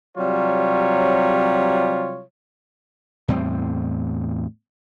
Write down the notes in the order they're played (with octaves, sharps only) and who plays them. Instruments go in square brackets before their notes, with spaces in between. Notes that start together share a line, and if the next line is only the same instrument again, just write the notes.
[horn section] C3 F#3 G3 F4 C#5
[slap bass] E2 A2 G3 C4